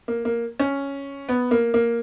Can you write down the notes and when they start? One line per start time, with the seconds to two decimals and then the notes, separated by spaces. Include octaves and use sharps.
0.08 A#3
0.25 A#3
0.59 C#4
1.29 B3
1.51 A#3
1.74 A#3